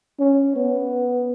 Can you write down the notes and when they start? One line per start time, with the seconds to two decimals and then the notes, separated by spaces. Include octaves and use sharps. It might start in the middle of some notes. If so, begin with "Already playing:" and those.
0.20 C#4
0.56 B3